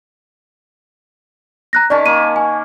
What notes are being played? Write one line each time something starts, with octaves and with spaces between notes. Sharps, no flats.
A#5 F#6 A#6
D#3 C#4 D5 A5
A#3 D#7
G#5